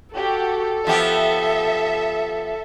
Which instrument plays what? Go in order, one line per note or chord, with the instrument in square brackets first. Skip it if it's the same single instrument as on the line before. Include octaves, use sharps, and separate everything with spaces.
[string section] F#4 G4 [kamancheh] A4
[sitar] F3 B3 G4 [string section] E5